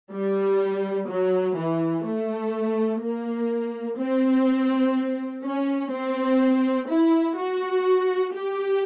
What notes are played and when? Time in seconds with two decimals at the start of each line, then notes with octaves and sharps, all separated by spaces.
0.11 G3
1.09 F#3
1.57 E3
2.05 A3
3.02 A#3
3.99 C4
5.44 C#4
5.92 C4
6.89 E4
7.37 F#4
8.34 G4